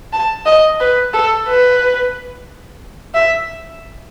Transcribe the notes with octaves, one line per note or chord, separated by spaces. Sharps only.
A5
D#5
B4
A4
B4
E5